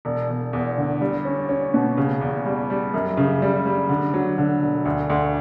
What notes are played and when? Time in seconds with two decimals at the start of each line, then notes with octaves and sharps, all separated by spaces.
0.05 E1
0.29 E1
0.53 E2
0.77 D3
1.01 G3
1.25 C#4
1.49 C#4
1.74 B2
1.97 C#3
2.21 E2
2.45 G3
2.70 G3
2.94 F#2
3.17 C#3
3.42 G3
3.66 G3
3.89 D3
4.14 F#3
4.38 D3
4.62 E1
4.85 D2
5.10 D2